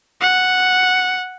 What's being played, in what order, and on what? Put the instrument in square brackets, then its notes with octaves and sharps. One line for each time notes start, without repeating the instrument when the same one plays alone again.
[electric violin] F#5